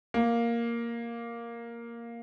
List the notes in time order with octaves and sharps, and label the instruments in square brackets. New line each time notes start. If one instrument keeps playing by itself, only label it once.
[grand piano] A#3